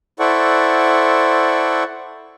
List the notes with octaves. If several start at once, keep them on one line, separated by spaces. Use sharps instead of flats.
E4 A4 C5 D5 F#5 C#6